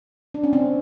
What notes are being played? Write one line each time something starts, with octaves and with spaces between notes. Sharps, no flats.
D4
C#4
C4 D4